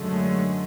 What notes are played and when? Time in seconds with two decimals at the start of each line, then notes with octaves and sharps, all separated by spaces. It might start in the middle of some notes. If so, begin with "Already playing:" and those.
Already playing: F#2 D3 G#3 A3